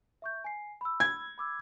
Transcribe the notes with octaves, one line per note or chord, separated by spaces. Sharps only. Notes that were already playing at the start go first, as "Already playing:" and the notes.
E5 C#6 G6
G#5 C7
B5 E6
G#6
B5 D6 E6